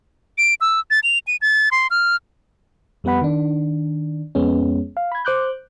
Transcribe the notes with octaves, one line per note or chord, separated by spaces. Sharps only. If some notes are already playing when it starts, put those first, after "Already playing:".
D7
E6
A6
F7
D#7
A6
C6
F6
F2 G3 B3 B4 F#5 B5
D#3 D4
F2 G#3 B3 C#4
F5
B5 G#6
C5 D6 F#6 G6